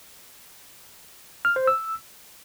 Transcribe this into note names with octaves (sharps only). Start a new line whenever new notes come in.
F6
C5
E6